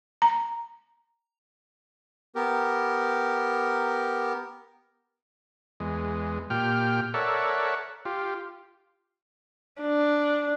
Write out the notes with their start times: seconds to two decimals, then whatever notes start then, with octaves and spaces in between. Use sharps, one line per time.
0.22 A#5
2.35 B3 G4 A#4
5.80 E2 G#3
6.50 A#2 G4 G5 F6
7.14 A4 A#4 C#5 D5 E5 F#5
8.05 F4 G4
9.82 D4